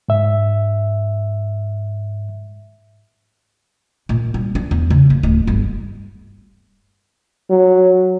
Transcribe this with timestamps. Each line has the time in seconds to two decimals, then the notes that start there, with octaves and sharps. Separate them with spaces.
0.09 G#2 E5
4.09 A#2
4.34 G3
4.55 D4
4.71 E2
4.90 C#3
5.10 A#3
5.23 D1
5.47 G1
7.50 F#3